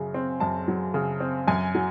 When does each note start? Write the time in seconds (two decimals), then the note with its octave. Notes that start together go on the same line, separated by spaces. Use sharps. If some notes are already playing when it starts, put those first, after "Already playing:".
Already playing: F#2 C#3 F#3
0.14 C4
0.40 F#2 A5
0.68 F#3
0.94 C#3
1.20 C4
1.48 F#2 G#5
1.75 F#3